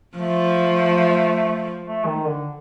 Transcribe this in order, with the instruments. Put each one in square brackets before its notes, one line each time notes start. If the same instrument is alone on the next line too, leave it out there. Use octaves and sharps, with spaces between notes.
[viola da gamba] F3 [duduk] A3
[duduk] A3
D#3
D3